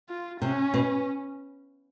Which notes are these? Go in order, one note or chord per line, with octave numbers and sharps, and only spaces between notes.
F4
C3 C#4
B2